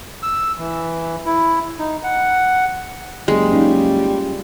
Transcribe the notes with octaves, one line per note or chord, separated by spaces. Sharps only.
E6
E3
E4
D#4
F#5
F#1 G3 G#3
C#4 D#4 F4